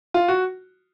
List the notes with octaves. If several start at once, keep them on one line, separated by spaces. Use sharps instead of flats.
F4
F#4